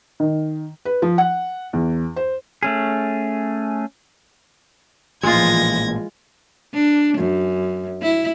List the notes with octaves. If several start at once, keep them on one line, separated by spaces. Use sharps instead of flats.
D#3
B4
F3
F#5
E2
C5
A3 C#4 G#4
A1 A#2 E3 F3 G#3 F4 G#6 A#6
D4
F#2
E4